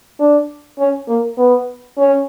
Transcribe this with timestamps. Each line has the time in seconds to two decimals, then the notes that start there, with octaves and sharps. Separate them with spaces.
0.20 D4
0.79 C#4
1.08 A#3
1.38 B3
1.97 C#4